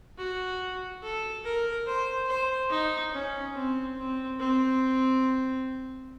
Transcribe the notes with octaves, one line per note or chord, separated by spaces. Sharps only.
F#4
A4
A#4
C5
C5
D#4
C#4
C4
C4
C4